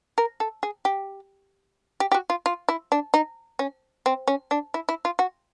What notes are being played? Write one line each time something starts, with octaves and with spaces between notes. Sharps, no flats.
A#4
A4
G#4
G4
G4
G4
F#4
F4
F4
E4
D4
D#4
C#4
C4
C#4
D4
E4
E4
F4
F#4